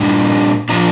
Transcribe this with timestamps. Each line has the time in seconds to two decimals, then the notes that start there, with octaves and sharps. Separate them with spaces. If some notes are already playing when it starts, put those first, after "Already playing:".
Already playing: A#2 G3 D4
0.69 A#2 F3 D4 A#5